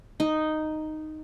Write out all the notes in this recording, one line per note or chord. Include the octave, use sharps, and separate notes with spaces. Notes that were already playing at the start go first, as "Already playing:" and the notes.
D#4